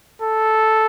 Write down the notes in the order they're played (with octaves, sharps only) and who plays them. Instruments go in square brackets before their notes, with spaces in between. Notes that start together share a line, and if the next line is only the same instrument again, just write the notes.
[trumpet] A4